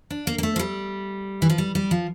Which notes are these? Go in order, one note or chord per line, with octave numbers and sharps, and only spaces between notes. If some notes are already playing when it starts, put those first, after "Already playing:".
D4
A#3
A#3
A3
F3
G3
E3
F3
G3
G3
F3